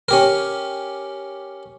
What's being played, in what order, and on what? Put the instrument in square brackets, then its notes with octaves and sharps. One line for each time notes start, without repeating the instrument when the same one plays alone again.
[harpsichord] C#4 G4 A#4